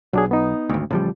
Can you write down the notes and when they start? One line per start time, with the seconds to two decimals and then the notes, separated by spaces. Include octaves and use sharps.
0.13 B1 F#3 D4 G#4
0.31 B3 D#4
0.69 G#1 D2
0.91 A1 C#3 F3 G3